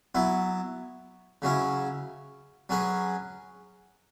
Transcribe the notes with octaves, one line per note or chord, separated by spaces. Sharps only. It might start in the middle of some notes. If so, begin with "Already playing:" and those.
F#3 B3 E4
C#3 F#3 C#4 E4
F#3 C#4 G#4 B4